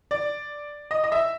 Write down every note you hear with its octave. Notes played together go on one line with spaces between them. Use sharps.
D5
D#5
D#5
E5